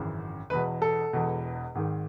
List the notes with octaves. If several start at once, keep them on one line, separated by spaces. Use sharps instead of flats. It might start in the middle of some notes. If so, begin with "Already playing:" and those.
Already playing: G#1 F#2 C#3 E3
E1 E2 B2 B4
A4
E1 E2 B2
G#1 G#2 D#3